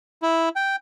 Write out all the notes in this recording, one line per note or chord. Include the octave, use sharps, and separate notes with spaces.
E4
G5